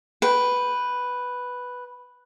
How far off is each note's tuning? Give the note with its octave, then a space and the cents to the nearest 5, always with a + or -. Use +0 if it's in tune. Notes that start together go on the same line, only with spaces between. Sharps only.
B4 +0 G5 +0